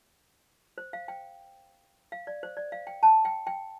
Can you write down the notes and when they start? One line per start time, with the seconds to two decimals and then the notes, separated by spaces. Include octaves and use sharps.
0.78 C5
0.93 F5
1.08 G5
2.12 F5
2.27 D5
2.43 C5
2.57 D5
2.72 F5
2.87 G5
3.03 A5
3.25 G5
3.47 G5